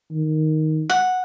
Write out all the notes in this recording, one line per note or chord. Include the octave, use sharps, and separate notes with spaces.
D#3
F#5